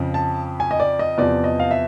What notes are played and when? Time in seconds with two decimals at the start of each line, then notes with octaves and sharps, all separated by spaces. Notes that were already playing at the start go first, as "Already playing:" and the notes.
Already playing: F2 C#3 F3
0.14 A5
0.60 G#5
0.71 D#5
0.80 D5
0.99 D#5
1.18 E2 C3 F3 D5
1.44 D#5
1.60 F5
1.71 E5